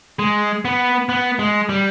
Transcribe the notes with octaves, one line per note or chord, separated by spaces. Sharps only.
G#3
B3
B3
G#3
G3